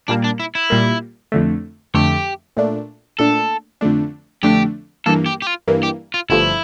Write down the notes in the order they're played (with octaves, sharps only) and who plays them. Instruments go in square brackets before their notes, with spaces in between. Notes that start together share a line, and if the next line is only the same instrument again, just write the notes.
[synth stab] A#2 G3 A#3 [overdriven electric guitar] D4
[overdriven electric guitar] D4
E4
E4
[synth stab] A#2 G3 A#3
F2 D3 A3
[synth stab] F2 D3 A3 [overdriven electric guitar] G4
[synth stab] A#2 A3 D4
[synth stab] A#2 A3 D4 [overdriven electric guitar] A4
[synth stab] F2 D3 A3 D4
[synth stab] F2 D3 A3 D4 [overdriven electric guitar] G4
[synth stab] G2 E3 A#3 [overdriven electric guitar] A4
[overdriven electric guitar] G4
G4
F4
[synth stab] G2 E3 A#3
[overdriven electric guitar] G4
F4
[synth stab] G1 G2 F3 A3 [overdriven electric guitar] E4